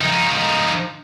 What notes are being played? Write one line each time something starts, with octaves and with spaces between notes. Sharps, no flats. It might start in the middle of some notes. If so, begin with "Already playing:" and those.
F3 D#4